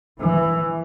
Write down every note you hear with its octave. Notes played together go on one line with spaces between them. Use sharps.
E3